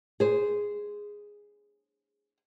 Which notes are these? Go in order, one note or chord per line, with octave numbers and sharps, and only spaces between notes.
G#4 C5